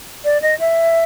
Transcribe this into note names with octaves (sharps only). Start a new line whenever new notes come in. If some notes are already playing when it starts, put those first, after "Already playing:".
D5
D#5
E5